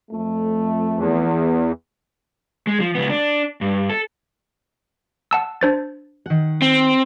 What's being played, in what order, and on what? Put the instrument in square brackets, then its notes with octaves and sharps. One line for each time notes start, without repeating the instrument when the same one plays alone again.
[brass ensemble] F2 A3
[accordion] E2
[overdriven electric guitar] G#3
F3
C#2 B3
D4
G2
A4
[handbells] F#5 A5 E6
D4 C5 A6
[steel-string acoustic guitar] D#3 F#5
[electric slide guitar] C4